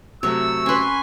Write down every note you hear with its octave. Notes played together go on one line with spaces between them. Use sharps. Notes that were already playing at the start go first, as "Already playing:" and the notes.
C3 F#3 A3 C#5 E6
C#4 B4 G#5 C6